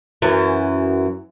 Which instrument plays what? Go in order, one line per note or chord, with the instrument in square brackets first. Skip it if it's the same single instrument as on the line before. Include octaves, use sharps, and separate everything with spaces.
[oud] F#2 E3